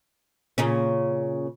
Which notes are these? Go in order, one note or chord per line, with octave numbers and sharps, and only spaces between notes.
A#2 C#3 C#4